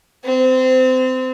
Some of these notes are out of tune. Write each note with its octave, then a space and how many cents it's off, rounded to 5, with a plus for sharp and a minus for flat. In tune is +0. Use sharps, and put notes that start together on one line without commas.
C4 -25